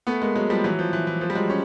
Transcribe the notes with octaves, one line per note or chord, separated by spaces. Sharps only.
A3 B3
G#3 A#3
F#3 G#3
F3 G3
E3 F#3
F3
E3
E3
F3
G3
F#3 G#3
C#4